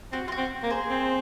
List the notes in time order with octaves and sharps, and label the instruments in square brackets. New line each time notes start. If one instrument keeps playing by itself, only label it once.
[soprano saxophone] C4 [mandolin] F#4
[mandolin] F4
F#4
[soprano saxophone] C4
A#3
[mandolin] G#4 C5
[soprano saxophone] C4